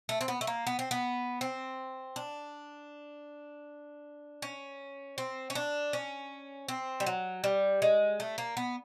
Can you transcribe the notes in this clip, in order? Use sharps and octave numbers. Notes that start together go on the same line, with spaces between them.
A3
C4
B3
A3
A#3
B3
C4
B3
C4
D4
C#4
C4
C#4
D4
C#4
C4
G3
F#3
G3
G#3
A3
A#3
B3